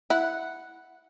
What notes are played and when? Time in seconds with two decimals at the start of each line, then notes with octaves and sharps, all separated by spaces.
0.10 E4 F#5